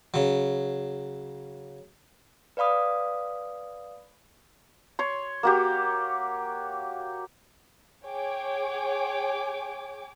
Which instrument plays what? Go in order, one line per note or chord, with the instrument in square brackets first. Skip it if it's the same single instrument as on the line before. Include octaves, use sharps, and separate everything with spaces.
[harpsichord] C#3 F#3
[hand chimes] B4 D5 F5 B5 D#6
[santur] C#5 C6
A#3 F#4 G4
[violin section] G#4 C#5 G5 G#5 D6